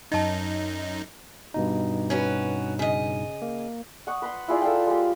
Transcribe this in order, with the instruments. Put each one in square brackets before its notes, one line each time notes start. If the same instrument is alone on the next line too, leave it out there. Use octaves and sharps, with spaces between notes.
[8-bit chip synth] F#2 D#4 [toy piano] D#5 A5
[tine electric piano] G2 B2 D#4
[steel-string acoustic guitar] C#4 F#4 B4
C#3 D#5
[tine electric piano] A#3
[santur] F#5 C#6 D#6
B4 B5 C6
E4 F4 G#4 D5
A4 F5 G5
G#3 G4